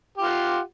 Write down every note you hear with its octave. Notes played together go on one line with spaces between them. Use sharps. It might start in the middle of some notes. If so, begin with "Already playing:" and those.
F4 G4 F#5